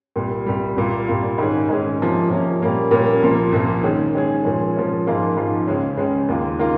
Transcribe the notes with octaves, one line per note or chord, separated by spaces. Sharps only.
C2 A#2 G3
C2 A#2 G3
C2 A#2 G3 A#3 F4
C2 A#2 G3 A#3 F4
G#2 D#3 G#3 C#4 G#4
G#2 D#3 G#3 C#4 G#4
C3 F3 A#3 C#4
C3 F3 A#3 C#4
A#2 G3 A#3 C#4
A#2 G3 A#3 C#4
C2 A#2 F3 A#3
C2 A#2 F3 A#3
D#3 G#3 C#4 G#4
D#3 G#3 C#4 G#4
A#2 F3 G#3 C#4
A#2 F3 G#3 C#4
G#2 F3 A#3 F4 G#4
G#2 F3 A#3 F4 G#4
C#2 C#3 G#3 C#4
C#2 C#3 G#3 C#4
D#2 D#3 A#3 F4
D#3 A#3 F4